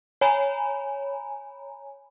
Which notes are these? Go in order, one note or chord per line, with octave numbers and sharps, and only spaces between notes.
C#5 G#5 A#5 B5